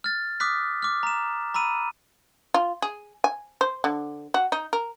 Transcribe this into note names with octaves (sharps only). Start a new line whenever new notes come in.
F6 A6
D6 D#6 F6 F#6 B6
D6 F6
A#5 E7
A#5 B5 E6 D#7
F4
G#4
G#5
C5
D3
F#4
D#4
A#4